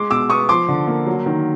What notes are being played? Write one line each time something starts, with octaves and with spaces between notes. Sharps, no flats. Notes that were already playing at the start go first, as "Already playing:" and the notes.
Already playing: G#3 C6 D6
B2 D6 E6
B3 C#6 D#6
F3 C6 D6
D3
A#3
F#3
D#3